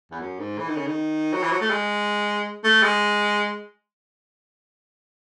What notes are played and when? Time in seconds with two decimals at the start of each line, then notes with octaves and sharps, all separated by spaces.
0.11 E2
0.20 F#2
0.39 G#2
0.58 E3
0.68 D#3
0.77 C#3
0.87 D#3
1.33 F#3
1.43 E3
1.52 F#3
1.61 A3
1.70 G#3
2.64 A3
2.83 G#3